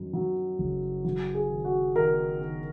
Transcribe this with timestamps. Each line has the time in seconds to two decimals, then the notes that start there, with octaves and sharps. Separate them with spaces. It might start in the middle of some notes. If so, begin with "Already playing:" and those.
Already playing: F#2 D#3
0.13 F#3
0.59 F#1
1.05 F#3
1.34 G#4
1.50 D#3
1.65 F#4
1.95 D#3 A#4
2.41 D#3